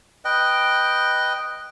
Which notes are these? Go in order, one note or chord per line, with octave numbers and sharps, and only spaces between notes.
B4 D#5 G5